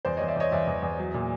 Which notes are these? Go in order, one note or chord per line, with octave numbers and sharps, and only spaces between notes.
E2 C5 D5
E2 C#5 D#5
D5 E5
E2 C#5 D#5
E2 D5 E5
E2
E2
F#3
A#2